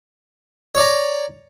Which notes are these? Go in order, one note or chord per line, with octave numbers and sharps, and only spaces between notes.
C#5 D5 A#5